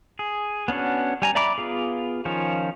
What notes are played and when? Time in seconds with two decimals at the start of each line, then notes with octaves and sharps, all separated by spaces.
0.19 G#4
0.68 B3 C#4 D4 F#4
1.22 G3 G#5 A#5
1.35 D5 E5 A#5 B5 D6
1.58 B3 F4 G#4
2.25 D#3 F3 C#4 F4